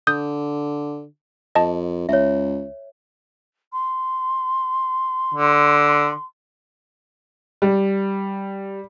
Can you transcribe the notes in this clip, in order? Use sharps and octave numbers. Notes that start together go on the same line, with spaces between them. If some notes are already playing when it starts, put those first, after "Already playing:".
D3 D#6 G6
F2 D#5 A5
C#2 C#5 E5
C6
D3
G3